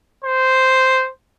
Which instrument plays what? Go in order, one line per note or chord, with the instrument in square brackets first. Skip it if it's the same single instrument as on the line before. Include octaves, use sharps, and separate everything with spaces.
[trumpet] C5